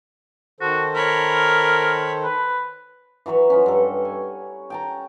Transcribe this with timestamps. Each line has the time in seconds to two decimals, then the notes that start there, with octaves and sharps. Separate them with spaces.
0.60 D#3 F#4 A4 C5
0.95 A#4 C#5 B5
2.24 B4
3.26 E3 F#3 B4 C#5
3.50 F3 F#3 C#4
3.66 G2 A4
4.05 G#5
4.70 G5 A5 A#5